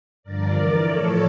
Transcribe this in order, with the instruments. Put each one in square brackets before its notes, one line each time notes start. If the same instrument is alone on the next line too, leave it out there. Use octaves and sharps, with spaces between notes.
[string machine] G2 D3 F3 A#4 D5
E2 E3
A2 F3 A4 C#5